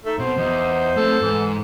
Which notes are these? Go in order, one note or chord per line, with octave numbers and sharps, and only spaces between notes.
A3 D#4
B2 C4 C5
E2 D#4
A3 C4 A4
G#2 E3